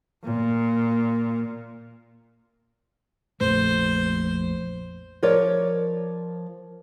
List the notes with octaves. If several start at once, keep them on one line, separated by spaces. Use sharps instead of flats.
A#2
A#1 F2 A3 C5
F3 A#4 C#5 D5